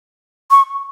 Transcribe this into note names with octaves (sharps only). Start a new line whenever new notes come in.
C#6